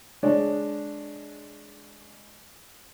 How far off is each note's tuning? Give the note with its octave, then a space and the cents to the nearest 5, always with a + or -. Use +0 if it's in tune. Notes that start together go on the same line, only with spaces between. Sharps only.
G#3 +10 D4 +0 C#5 +0